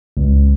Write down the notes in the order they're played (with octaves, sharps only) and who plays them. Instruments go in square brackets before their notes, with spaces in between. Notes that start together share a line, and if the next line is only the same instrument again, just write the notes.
[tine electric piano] C#2